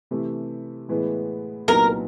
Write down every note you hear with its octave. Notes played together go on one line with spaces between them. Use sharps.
C3 E3 A3
A2 E3 G#3 B3
C2 A#2 F#3 B3 D#4 A#4